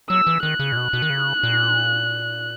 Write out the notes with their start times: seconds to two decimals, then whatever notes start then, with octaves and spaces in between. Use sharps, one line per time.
0.09 F#3 E6
0.27 E3
0.42 D#3 F#6
0.59 C#3
0.72 A#2
0.77 B2
0.93 B2
1.02 D#3
1.10 C#3
1.43 A#2